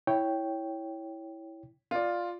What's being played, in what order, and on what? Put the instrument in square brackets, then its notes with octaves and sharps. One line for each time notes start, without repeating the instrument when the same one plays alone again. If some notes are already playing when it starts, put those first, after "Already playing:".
[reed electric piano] E4 C#5 G5
[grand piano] F4 D5